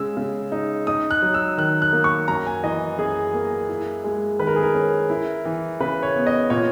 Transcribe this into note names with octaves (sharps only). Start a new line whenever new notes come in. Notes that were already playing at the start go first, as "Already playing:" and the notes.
Already playing: C#3 G#3 E6
C#3
D#4
D#4 D#6
F#6
F#3
E6
D#3 F#6
F#6
A#3
C#6
F#2 A#5
G#5
E3 D#5
F#2 G#4
A#3
E4
G#3
D#3 B4
A#4
G#4
A#4
C#4
E4
E3
C#3 B4
C#5
B3
D#5
A#2 C#5